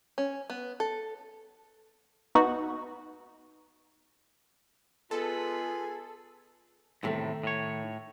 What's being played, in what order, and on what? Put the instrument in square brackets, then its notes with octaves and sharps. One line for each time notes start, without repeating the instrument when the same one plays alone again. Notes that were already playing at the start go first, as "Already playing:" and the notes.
[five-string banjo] C#4
B3
A4
[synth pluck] B3 D#4 F#4
[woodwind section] G#3 B3 F4 [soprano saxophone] G#4 [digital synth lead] A4 [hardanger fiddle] B4
[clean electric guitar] E2 A2 C3 [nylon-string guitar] D#3 A3
[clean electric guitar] A2 C#5